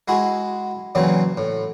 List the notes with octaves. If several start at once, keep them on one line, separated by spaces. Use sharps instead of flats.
G#3 E4 F#4 G#4
A#2 C#3 E3 F#3 C4
A2